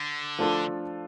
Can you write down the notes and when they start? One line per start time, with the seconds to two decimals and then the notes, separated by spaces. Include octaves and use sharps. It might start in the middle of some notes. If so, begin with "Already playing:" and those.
Already playing: D3
0.39 F3 A3 D4 F4 A4